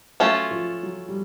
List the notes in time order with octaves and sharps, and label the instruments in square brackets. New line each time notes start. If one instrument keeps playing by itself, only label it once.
[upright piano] F#3 [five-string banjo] A3 C#4 F4
[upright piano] F3
F#3
G3